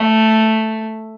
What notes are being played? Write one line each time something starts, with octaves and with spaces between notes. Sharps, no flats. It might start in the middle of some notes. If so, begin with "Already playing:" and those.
Already playing: A3